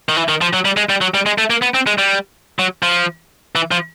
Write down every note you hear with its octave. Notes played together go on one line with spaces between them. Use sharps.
D#3
E3
D#3
F3
F#3
G3
G#3
G3
F#3
G3
G#3
A3
A#3
B3
C4
G#3
G3
F#3
F3
E3
F3